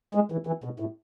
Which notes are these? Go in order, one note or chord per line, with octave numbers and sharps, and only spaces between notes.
G#3
E3
E3
B2
A2